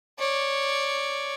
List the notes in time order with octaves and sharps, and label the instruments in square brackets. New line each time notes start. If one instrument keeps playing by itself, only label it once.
[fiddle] C#5 D5